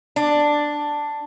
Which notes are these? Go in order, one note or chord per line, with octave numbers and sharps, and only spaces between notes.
D4